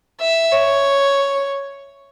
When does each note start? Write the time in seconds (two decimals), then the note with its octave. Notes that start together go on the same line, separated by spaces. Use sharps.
0.21 E5
0.52 C#5